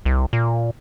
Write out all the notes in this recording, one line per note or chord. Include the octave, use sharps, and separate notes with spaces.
C2
A#2